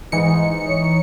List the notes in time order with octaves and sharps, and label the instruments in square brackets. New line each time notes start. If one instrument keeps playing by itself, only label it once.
[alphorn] G#2 [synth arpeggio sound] E3 D#4 C#7
[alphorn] C#5